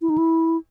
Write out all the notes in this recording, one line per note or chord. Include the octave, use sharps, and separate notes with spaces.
E4
D#4
E4